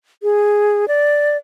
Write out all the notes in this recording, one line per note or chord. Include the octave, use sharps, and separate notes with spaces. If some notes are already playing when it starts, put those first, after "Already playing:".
G#4
D5